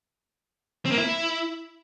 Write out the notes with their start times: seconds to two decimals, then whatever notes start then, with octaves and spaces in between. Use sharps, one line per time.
0.85 C4
0.92 A#3
0.98 E4